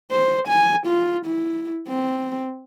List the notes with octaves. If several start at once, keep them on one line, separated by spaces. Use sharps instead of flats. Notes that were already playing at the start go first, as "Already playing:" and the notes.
C5
G#5
F4
E4
C4